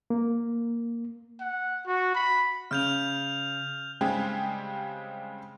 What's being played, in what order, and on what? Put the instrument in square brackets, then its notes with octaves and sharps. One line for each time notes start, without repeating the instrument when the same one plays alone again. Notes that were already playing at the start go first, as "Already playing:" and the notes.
[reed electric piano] A#3
[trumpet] F#5
F#4
B5
[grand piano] C#3 [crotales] F6 G6 F7
[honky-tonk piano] C#3 G3 G#3 C4 G4 G#4